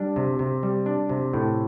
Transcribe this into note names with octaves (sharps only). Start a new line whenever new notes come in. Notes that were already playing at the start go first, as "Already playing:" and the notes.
Already playing: G3 D4
C3
C3
G3
D4
C3
A2